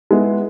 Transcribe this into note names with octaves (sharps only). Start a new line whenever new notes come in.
G#3 B3 E4